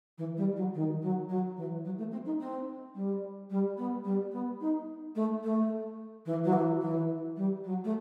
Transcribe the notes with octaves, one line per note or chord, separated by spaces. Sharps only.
E3
G3
F#3
D#3
F#3
F#3
E3
F#3
A3
C4
D#4
C4
G3
G3
B3
G3
B3
D#4
A3
A3
E3
F#3
E3
E3
G3
F#3
A3